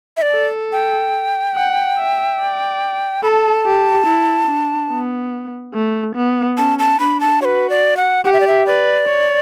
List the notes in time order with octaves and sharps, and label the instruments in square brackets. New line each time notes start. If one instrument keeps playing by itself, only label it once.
[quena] E5
D5
[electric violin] A4
[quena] G5
[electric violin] F#5
E5
D5
[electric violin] A4 [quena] B5
[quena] A5
[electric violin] G4
E4
D4
B3
A3
B3
[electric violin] C#4 [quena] A5
[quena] A5
[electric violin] D4 [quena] B5
[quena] A5
[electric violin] F#4 [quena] B4 C#5
[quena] D5
F#5
[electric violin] G4 [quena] F#5
[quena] E5
D5
E5
[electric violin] B4 [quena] D5
[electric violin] C#5